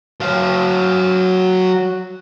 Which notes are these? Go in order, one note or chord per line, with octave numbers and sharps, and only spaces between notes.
F#3 F5